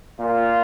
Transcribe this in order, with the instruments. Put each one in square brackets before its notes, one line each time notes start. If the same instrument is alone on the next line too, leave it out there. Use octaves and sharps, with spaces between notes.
[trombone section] A#2 A#3 F4